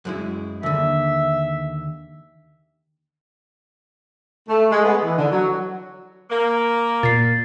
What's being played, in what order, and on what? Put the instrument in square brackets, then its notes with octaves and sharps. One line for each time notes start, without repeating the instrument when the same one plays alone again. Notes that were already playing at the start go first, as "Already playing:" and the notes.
[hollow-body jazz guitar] F#2 G#3 E4
[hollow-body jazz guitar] D#2 D3 [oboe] E5
[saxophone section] A3
G#3
B3
E3
D3
F#3
A#3
[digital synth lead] A#2 [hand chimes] A6 C7